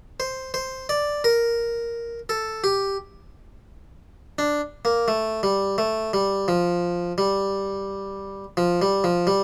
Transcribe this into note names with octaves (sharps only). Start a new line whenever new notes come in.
C5
C5
D5
A#4
A4
G4
D4
A#3
A3
G3
A3
G3
F3
G3
F3
G3
F3
G3